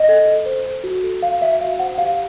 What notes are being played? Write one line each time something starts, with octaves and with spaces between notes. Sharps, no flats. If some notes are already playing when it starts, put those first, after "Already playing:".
Already playing: D#5
A4
A4
C5
A4
F#4
A4
F#4 F5
F#4 E5
F#4 F5
C5 F#5
G4 F5